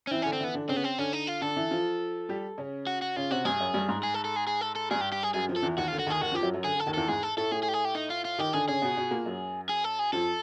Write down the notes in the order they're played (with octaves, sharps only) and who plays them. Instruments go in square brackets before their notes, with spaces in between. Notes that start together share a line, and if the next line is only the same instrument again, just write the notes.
[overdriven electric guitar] C#4
[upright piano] E3 E4 [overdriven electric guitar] C4
[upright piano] D3 D4 [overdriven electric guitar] C#4
[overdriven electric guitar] C4
[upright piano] E3 E4 [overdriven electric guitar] B3
[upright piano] D3 D4
[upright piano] C#3 C#4 [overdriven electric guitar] C4
[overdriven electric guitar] B3
C4
[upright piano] D3 D4 [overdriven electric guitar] C#4
[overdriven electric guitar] D#4
F4
[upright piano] D3 D4 [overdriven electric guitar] A4
[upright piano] E3 E4
F3 F4
G3 G4
C#3 C#4
[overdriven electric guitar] F#4
F#4
[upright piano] C#3 C#4 [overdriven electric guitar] F4
[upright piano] C3 C4 [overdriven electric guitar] F#4
[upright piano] G2 G3 [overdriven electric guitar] G#4
[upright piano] F#2 F#3
G2 G3
G#2 G#3
[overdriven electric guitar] G#4
A4
A4
G#4
G#4
A4
A4
[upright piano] G2 G3 [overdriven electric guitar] G#4
[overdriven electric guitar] G4
G4
G#4
[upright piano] F#2 F#3 [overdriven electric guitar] G#4
[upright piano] F2 F3
[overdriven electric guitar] A4
[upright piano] E2 E3
[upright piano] D#2 D#3 [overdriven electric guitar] F#4
[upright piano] D3 [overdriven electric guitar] F4
[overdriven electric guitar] F#4
[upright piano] D#2 D#3 [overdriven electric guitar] G#4
[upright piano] D#2 D#3 [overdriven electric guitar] F#4
[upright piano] F2 F3 [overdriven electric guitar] G4
[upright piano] F#2 F#3
F#2 F#3
[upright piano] D3 [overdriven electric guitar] G#4
[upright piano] D3 [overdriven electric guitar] A4
[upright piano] D#2 D#3
[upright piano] E2 E3 [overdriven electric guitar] A4
[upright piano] G#2 G#3 [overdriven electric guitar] G#4
[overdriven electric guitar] A4
[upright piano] A2 A3 [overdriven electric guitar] A4
[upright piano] A2 A3 [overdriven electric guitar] G#4
[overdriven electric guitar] G#4
G4
G#4
G4
D#4
F4
F4
[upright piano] D#3 D#4 [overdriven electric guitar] G4
[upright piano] D3 D4 [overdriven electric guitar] G#4
[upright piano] C#3 C#4 [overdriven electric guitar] G#4
[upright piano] B2 B3
B2 B3
A#2 A#3
F#2 F#3
[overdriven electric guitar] G#4
A4
G#4
[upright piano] F2 F3 [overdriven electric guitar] A4